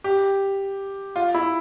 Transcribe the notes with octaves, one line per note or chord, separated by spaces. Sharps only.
G4
F4
E4